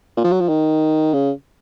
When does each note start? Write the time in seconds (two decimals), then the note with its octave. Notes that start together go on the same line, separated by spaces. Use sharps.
0.17 A#2
0.24 F3
0.32 F#3
0.40 F3
0.48 D#3
1.13 C#3